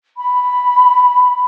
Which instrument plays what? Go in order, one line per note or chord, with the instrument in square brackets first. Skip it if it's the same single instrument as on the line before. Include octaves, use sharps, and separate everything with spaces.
[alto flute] B5